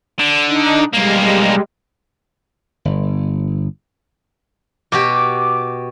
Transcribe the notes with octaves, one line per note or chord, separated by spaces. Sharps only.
D3
D4 D#4
B1 G3 G#3 A#3
G1
B2 F#4 G4 D6